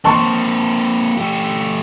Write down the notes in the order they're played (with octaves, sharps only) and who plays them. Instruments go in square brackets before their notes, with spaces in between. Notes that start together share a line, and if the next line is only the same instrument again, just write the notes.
[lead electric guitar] A#3 C4 [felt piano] A5 C6 C#6
[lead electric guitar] A3 G4